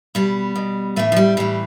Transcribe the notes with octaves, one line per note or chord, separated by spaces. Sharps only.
B2 G3
B2
A2 E3 A3
F3
G3
A2 E3 G3